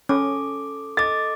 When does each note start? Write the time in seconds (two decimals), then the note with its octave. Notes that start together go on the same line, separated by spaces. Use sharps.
0.09 C#4 A4 D6
0.97 A4 D#5 D6 A6